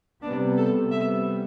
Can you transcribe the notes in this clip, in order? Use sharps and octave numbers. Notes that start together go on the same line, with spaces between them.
C3 G3 B3 D4
A4
C3 G3 B3 E5